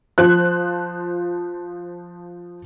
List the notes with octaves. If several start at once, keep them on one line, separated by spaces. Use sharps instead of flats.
F3 C5 F#6